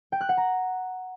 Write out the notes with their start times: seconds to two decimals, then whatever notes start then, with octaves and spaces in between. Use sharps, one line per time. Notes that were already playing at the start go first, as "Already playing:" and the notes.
0.12 G5
0.21 F#6
0.29 F#5
0.37 A#5